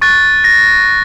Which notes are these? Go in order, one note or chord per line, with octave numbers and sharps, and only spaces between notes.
C#6 F#6 A6
A#6